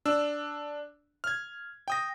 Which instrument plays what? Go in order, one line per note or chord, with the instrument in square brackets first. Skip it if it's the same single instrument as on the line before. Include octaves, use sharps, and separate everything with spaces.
[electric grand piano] D4 E6
F6 G#6
G5 D#6 A#6